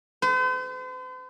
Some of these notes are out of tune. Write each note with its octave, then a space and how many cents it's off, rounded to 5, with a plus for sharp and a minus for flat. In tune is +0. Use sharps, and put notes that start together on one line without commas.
C5 -45